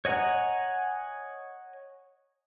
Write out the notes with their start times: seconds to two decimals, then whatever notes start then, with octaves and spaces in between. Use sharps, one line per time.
0.05 C#5 D#5 F#5 G#5 A#5